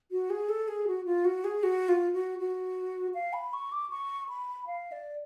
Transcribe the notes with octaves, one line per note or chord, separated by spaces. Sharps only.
F#4
G#4
A4
G#4
F#4
F4
F#4
G#4
F#4
F4
F#4
F#4
F5
B5
C#6
D6
C#6
B5
F5
D5